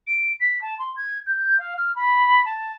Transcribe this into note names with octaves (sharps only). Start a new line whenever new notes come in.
D7
B6
A5
C6
G#6
G6
F5
F6
B5
A5